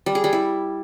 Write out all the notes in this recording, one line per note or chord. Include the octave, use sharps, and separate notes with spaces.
G3
G#4
G3
E4